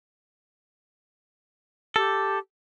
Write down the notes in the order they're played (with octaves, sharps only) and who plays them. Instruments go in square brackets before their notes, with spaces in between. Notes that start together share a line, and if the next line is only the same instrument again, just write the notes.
[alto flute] G4 [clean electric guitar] A4